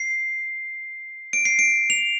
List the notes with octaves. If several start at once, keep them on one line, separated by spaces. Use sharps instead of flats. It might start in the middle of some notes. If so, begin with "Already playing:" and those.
Already playing: C7
D7
C7
D7
F7